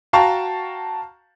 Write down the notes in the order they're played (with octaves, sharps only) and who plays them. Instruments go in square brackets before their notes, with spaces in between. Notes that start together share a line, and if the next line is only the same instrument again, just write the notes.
[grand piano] F#4 F5 G5 A5 A#5 C#6